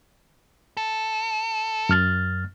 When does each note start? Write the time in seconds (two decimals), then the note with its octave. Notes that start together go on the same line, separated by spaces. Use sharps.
0.77 A4
1.89 F#2 F6 A6